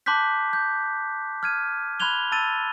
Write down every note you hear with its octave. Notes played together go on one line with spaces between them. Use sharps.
A5 C6 D6 F#6 G6 B6
G6
F6 G#6 D#7
B5 C6 F#6 G#6 F7 G7
A5 E6 A6 D#7